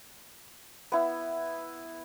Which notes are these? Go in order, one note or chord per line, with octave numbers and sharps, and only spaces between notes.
B3 E4